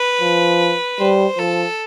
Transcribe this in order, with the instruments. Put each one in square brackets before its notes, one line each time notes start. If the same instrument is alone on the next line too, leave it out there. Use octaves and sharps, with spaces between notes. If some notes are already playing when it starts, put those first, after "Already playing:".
Already playing: [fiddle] B4
[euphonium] F3
[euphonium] G3 [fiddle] C5
[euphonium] F3 [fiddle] A4